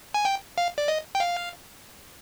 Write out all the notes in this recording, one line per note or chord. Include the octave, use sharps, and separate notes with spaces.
G#5
G5
F5
D5
D#5
G5
F5